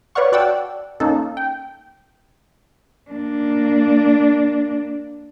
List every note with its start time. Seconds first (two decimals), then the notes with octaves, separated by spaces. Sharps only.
0.15 B4 C#5 D5 F5 F#5 C#6
0.32 F#4 D5 F#5 G5 A5 E6
1.00 A#3 C#4 D#4 A4
1.37 G5
3.11 A#3 D4